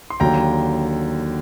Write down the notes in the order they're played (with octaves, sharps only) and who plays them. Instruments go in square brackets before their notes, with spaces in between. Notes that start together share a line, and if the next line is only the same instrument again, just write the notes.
[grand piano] C6
D#2 D3 F#3 G5 A#5